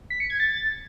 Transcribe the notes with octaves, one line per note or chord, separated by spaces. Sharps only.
B6
C#7
G#6
A6